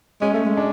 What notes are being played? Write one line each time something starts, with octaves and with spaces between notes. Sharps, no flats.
G#3 C#4
A3
G#3
D4